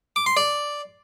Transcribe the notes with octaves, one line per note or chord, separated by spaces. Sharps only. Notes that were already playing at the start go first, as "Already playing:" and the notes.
D6
C6
D5